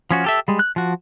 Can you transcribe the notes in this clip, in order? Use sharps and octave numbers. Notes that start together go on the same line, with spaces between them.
F3 C#4 F#4
G4 A4 E5
G3 G#3
F#6
F3 F#4